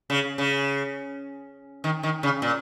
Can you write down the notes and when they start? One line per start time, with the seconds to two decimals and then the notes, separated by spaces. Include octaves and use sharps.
0.10 C#3
0.38 C#3
1.84 D#3
2.03 D#3
2.23 C#3
2.42 A#2